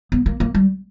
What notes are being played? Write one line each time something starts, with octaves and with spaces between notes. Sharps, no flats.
B3
A#3
A#3
G3